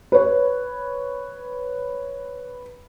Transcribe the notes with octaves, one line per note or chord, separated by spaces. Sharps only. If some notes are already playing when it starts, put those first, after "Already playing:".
B4 C#5